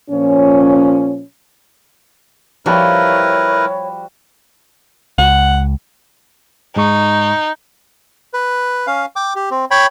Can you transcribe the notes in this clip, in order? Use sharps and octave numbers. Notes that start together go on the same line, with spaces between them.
A#2 F3 C#4
F3 G3 E4 F#4 A#4 B4 C#5 B5
C#2 F#5
G#2 G#3 D#4 C#6
B4
C#4 F5
G5 D6
G4
C4
C#5 G5 B5